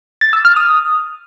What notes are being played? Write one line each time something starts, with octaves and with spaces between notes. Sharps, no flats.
A6
E6
F6
D#6